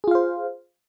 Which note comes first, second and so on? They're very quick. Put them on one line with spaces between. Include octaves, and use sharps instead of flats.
G#4 F4 F5 C5